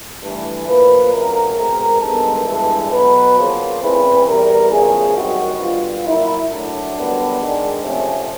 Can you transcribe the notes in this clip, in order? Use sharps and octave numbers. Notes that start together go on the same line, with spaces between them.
G2 E3 A3
A#2 F3 A#3 B4
F2 C#3 F#3 A3 A#4
B2 G#3 C4
G2 D#3 G#3 B3 A4
G2 E3 G#3 A4
B2 F#3 B3 B4
C#3 F3 A#3 C5
E2 C#3 E3 A3 C4 B4
E2 C3 E3 G3 A#4
E2 C#3 F3 A3 G#4
F#2 D#3 G3 C4 F#4
G2 D3 G3 B3 F4
A#2 F#3 A#3 E4
A2 F#3 A3 D4
F#2 D3 G3 B3
G#2 D#3 G#3
C3 F3 A3 C4 C#4